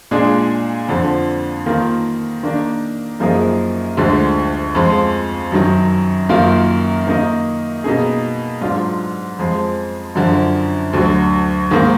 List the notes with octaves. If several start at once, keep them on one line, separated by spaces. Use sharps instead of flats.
A#2 G#3 D4 G#4
F2 D3 F3
D#3 A#3 F4
D#3 A#3 D4
F#2 F3 A#3 D#4 G#4
D2 D3 F3 G#3
F2 F3 G#3
F#2 D#3 F#3
F#2 D#3 A#3 F4
D#3 A#3 D#4
B2 A#3 D#4 G#4
G#2 F#3 D4 F4
F2 F3 G#3
F#2 D3 F3
D2 D3 F#3
G#2 D#3 A#3